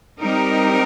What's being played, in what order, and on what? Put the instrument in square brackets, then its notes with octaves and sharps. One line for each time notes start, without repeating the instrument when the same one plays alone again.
[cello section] G3 C4 D#4 G4 A#4